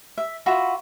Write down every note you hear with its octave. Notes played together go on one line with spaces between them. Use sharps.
E5
F4 F#4 E5 B5